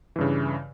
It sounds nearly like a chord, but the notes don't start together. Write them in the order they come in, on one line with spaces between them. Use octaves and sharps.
E3 G2 C#3